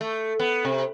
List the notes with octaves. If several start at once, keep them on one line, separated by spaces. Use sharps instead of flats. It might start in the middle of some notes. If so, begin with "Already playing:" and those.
A3
B3
C3